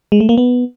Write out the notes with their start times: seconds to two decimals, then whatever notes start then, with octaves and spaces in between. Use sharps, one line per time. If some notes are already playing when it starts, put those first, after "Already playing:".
0.12 G#3
0.20 A3
0.29 A#3
0.38 B3